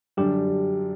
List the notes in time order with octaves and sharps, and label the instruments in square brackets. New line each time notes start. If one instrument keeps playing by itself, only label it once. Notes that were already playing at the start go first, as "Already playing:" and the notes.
[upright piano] F#2 D3 G3 D4 [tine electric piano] G4